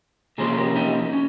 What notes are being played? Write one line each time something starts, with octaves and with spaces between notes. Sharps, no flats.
C3 F3 A#3 C#4 G#4 C5
G4 A#4
D#4 G4
C#4